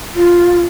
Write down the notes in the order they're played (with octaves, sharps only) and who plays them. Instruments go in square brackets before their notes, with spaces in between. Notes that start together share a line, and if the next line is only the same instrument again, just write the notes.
[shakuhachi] F4